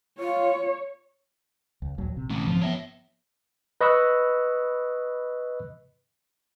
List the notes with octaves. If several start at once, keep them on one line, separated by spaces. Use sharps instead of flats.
F4 C#5
C#2
A#1 D#2 F#3
A#1 C3
A3 C#4
G#2 D3 F3 C4
F3 A#3 B3 C#5 E5
B4 D#5 B5 C#6 E6 F#6